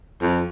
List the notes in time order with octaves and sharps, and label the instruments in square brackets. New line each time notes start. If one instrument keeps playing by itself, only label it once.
[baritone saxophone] F2